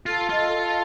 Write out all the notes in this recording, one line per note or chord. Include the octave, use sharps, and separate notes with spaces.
F4 A4
F4 D#5
A4